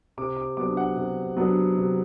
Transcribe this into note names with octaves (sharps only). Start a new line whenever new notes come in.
C3 D6
D6
F#3 B3 D4 D6
F#5
C3
F#3 B3 D4
C3